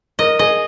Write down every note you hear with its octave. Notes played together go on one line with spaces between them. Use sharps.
A#4 D#5
G#4 D#5